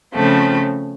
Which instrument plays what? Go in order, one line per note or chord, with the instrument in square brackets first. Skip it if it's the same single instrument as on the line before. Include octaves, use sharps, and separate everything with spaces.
[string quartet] C#3 F3 A3 C4